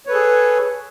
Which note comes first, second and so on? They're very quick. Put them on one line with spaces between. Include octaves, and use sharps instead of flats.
C#5 B4 A4 G#4